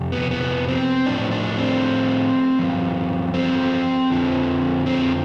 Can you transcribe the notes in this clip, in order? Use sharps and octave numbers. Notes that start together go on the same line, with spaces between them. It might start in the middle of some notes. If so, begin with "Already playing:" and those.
Already playing: F2 C3
B3
B3
C4
A2 F3 D4
D4
C4
G2 F3
C4
F2 D3 F3
C4